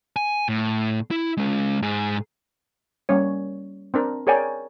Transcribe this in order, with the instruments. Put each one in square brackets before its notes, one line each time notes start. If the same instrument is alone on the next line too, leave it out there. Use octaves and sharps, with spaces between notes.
[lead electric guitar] G#5
A2
E4
G#3 C#4
G#2 G#4
[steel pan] G3 A#3 C#4 C#5
C4 D4 A#4
G#4 A#4 C#5 D5 G5 G#5